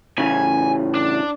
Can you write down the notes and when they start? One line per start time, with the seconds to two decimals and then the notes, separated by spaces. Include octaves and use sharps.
0.18 A2 C#3 E3 G#5
0.95 D4